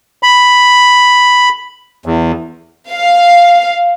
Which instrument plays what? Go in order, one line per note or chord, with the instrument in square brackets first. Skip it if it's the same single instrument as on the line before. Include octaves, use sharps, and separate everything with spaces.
[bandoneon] B5
E2
[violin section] F5